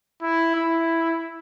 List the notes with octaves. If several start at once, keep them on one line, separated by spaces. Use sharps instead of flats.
E4
E4